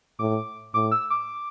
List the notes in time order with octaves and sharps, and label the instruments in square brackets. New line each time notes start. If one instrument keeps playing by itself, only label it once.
[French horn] A2 [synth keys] D6
[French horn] A2 [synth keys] D6
[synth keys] E6
D6